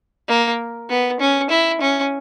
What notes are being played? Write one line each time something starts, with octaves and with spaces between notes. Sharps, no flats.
A#3
B3
C#4
E4
C#4